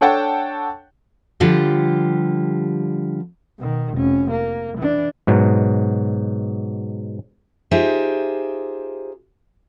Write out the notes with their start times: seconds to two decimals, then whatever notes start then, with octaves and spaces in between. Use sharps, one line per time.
0.01 D4 A4 C#5 F#5 G5 A5
1.40 D3 F3 G3 F4 G4
3.58 B2 D#3
3.94 F1 C#4
4.31 A#3
4.79 E3 D4
5.27 G#2 B2 F#3
7.71 D#4 F4 G4 G#4 C5 E5